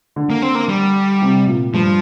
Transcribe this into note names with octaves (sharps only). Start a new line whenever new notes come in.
D3
A#3
C4
A#3
G3
C3
A#2
G2 F3